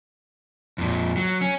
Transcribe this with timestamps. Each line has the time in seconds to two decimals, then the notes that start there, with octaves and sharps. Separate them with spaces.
0.78 F2 A#2
1.17 F#3
1.41 C#4